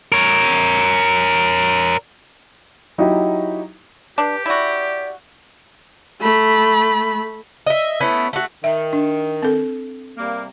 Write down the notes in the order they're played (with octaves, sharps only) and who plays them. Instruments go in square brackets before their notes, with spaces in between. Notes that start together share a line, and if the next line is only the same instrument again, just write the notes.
[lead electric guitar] A#4 C#5
[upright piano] F#3 D#4 E4 F#4 G4
[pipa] D4 [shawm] G4 [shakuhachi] B4
[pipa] E4 F#4 [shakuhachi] D5
[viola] A3 B5
[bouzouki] D#5 E5
A3 B3 C#4 E4
A3 F#4
[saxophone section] D#3 [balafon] E5
[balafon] D4
C4 A4
[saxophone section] C3 G3 A#3